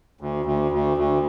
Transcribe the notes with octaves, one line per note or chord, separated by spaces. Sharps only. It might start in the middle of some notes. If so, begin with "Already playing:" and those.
D2
D2
D2
D2